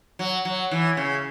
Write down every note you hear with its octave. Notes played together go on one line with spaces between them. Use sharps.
F#3
F#3
E3
C#3